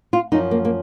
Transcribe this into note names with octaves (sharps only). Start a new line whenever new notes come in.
F4
F#2 F3 D#4
A#3
A#3